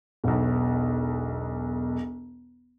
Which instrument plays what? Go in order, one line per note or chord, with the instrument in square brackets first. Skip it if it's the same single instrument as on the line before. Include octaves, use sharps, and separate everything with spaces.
[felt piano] E1 B1